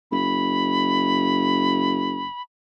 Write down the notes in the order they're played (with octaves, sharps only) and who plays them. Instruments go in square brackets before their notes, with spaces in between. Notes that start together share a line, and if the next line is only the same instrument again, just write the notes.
[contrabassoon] F#1 [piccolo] B5